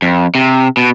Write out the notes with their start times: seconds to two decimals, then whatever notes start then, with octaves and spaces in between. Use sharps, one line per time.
0.02 F2
0.35 C3
0.77 B2